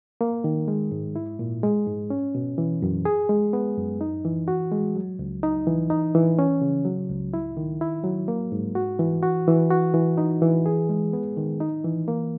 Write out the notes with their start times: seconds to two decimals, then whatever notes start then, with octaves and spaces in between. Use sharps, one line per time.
0.21 A#3
0.44 D#3
0.68 G#3
0.92 G#2
1.16 E4
1.39 A#2
1.63 G#3
1.87 G#2
2.10 C#4
2.35 B2
2.58 E3
2.82 F#2
3.05 G#4
3.29 G#3
3.53 B3
3.77 F#2
4.01 D#4
4.25 E3
4.48 F#4
4.72 G#3
4.96 F#3
5.19 C#2
5.43 D#4
5.67 E3
5.90 D#4
6.15 E3
6.39 C#4
6.62 C#3
6.85 F#3
7.10 C#2
7.34 E4
7.57 D#3
7.81 E4
8.04 F#3
8.28 A#3
8.52 G#2
8.75 F#4
8.99 E3
9.23 F#4
9.47 E3
9.70 F#4
9.94 E3
10.18 D#4
10.42 E3
10.66 G#4
10.89 G#3
11.13 B3
11.37 D#3
11.60 D#4
11.85 E3
12.08 A#3